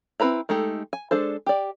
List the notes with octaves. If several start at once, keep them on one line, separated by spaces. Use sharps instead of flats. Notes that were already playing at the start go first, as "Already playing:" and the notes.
C4 E4 B4 A#5 B5
G#3 A3 D#4 G4 A4
G#5
G#3 D4 A4 C5
G4 D5